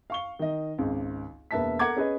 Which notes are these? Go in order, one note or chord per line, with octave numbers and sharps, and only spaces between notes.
F5 C#6 G7
D#3 D#5
G#1 C#2
E1 A#3 B4 E5 A5 B6
A4 A#4 F#5 A#5 D6 G#6
C#4 G#4 B4 D#5